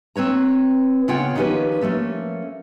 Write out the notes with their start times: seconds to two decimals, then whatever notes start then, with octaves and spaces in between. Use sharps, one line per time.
0.16 C4 B4 C#5 A#5
1.08 C#3 B3 F4 C#5 F#5 G5
1.35 D#3 F3 C#4 G4 B4
1.81 F3 A3 A#3 C#4